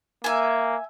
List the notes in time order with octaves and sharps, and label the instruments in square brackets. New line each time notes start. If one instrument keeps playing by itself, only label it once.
[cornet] A#3 [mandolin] E5 G#5